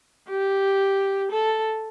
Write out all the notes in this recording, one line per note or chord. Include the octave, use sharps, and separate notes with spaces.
G4
A4